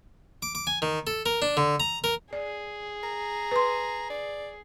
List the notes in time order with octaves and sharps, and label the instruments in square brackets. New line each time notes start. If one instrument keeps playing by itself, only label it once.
[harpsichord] D6
D6
G#5
D#3
A4
A#4
D4
D3
A#5
A#4
[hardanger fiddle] G#4 [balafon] D5
[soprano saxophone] A#5
[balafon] B4 C6
[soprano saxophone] D5